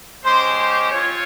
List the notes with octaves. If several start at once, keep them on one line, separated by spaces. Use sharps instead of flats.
G#3 C#4 G4 C5
C5
C4 F4 C#5